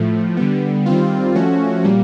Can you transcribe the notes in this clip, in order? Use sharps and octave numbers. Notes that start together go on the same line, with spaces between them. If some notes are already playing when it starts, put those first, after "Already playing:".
Already playing: A2 F3 A3
D3 G3 B3
D#3 G3 C4 F4
F3 A3 C#4 F#4
A#2 G3 A#3